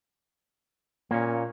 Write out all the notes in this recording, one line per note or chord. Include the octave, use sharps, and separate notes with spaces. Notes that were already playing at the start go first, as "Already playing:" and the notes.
A#2 A#3 C#4